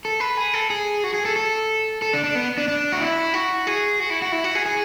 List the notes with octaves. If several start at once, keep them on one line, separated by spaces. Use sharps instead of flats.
A4
B4
G#4
A4
G#4
F#4
G#4
A4
A4
A4
D4
D4
B3
D4
D4
F#4
E4
F#4
G#4
F#4
E4
F#4
E4
F#4
G#4
G#4